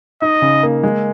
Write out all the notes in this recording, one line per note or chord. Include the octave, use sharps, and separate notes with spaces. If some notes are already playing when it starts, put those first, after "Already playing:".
D#4 D#5
C#3
A#3
G#3